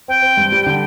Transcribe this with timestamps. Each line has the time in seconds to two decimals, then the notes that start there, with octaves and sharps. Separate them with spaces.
0.08 C4 G5
0.22 C4
0.37 G2
0.52 G3
0.66 D3